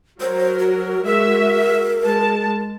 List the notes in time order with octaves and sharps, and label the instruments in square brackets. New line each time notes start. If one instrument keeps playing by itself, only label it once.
[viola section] F#3 A#4 [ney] C5
[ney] F#4
[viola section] G#3 F#4 E5 [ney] A#4
[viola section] G#3 A5